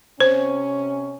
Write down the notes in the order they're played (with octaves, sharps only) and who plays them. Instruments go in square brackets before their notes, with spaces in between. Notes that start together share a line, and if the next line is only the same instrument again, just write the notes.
[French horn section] C3 C#4 [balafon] C5